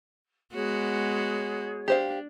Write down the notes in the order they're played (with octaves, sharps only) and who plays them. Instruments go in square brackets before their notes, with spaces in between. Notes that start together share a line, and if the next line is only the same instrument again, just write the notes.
[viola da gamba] G#3 B3 F#4 [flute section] G#4 C#5
[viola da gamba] D4 [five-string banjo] G4 C5 F5